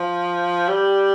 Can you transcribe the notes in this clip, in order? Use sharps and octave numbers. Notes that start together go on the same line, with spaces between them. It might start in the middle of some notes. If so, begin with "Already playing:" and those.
Already playing: F3
G3